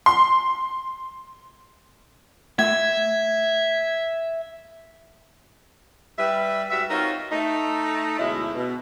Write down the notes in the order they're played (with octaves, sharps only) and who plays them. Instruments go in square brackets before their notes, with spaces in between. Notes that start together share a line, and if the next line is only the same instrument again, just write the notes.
[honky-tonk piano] C6
[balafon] A3 [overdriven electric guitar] E5 [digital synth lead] G#6
[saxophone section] G3 B4 E5
G#2 G3 F#4 E5
C4 D#4 F4 F#4 A#4 C#5
A3 D#4
D2 B2 G#3 C#4 E4
B2